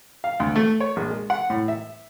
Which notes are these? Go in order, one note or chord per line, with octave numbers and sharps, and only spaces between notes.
F5
D2
A3
C#5
A#1
G#3
F#5
A2
E5